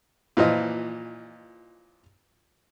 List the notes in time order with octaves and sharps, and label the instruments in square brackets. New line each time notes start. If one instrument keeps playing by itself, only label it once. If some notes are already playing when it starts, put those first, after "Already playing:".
[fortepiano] A#2 E3 F3 D#5